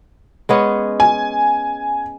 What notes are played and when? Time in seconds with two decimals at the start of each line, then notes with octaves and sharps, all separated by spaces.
0.49 G#3 B3 C#4
1.00 G#5